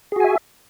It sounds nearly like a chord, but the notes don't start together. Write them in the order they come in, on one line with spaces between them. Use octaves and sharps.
G#4 F#4 G#5 E5